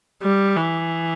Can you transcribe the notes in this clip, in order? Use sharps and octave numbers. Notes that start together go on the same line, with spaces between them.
G3
E3